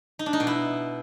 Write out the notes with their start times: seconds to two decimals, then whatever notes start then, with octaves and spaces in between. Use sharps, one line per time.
0.19 D#4
0.26 D4
0.33 D#4
0.40 B2
0.47 E4